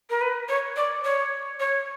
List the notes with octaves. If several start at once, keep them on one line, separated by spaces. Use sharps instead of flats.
A#4
B4
C#5
D5
C#5
C#5